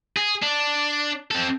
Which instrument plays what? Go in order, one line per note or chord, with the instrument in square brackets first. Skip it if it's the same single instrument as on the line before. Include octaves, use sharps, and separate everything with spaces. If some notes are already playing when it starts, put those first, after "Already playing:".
[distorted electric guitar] G#4
D4
C4 A4